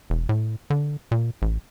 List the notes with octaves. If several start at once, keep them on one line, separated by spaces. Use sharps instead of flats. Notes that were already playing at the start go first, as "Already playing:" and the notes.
E1
A2
D3
A#2
A1